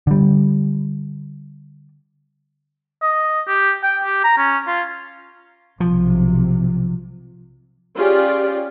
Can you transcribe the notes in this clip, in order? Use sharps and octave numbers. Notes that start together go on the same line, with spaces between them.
D3 G3
D#5
G4
G5
G4
A#5
C#4
F4
B1 C3 F3
C#4 F4 G4 G#4 D5